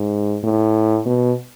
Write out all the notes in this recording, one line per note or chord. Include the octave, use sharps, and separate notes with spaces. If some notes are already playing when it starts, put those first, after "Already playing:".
Already playing: G#2
A2
B2